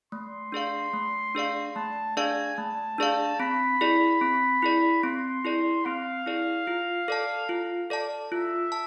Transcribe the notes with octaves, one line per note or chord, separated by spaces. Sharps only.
A3 C6
D4 G#4 D5 F5
A3
D4 G#4 D5 F5
A3 A5
D4 G#4 D5 F5 G#5
A3 A5
D4 G#4 D5 F5
C4 B5
E4 G#4 D5
C4
E4 G#4 D5
C4 C6
E4 G#4 D5
C4 F5
E4 G#4 D5
F4
A4 D5 A5
F4
A4 D5 A5
F4 E5
A5